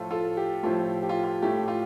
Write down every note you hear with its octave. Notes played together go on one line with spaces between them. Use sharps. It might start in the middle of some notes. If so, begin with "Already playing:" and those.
Already playing: A2 F3 A3 F4 A4
F4 A4
G4
A2 F3 A3 F4
G4
F4
F4
A2 A3 G4
G4
F4